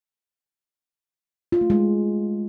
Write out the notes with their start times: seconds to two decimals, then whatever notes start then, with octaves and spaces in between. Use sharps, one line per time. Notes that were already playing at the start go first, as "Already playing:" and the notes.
1.52 F4
1.61 A3
1.70 G#3